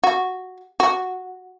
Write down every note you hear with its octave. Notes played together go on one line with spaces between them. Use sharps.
F#4
F#4